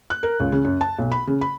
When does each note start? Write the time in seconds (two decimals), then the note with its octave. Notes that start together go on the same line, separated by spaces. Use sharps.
0.10 F#6
0.23 A#4
0.40 C#2
0.52 C#3
0.65 F#2
0.81 A5
0.99 B1
1.12 B5
1.27 C#3
1.41 B5